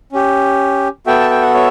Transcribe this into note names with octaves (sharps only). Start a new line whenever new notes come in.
C#4 G4
B3 F#4 A4 E5 G5
A5
G5
F#5
C#5 E5